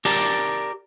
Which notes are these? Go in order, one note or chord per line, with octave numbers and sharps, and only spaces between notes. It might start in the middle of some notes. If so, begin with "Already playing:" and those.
G4 A#4 D5 A5